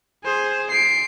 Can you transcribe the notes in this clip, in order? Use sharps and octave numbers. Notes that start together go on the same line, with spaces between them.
G#4 C5
C7 D7